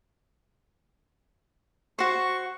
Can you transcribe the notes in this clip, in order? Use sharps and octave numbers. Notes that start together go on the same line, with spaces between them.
F#4 C5 C#6